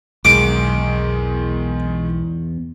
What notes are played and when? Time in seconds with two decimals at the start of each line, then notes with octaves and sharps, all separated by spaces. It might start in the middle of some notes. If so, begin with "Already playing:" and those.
0.25 B1 E2 D#3 G#3 D6